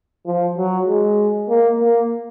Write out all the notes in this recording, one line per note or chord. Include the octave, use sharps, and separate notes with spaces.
F3
F#3
G#3
A#3
A#3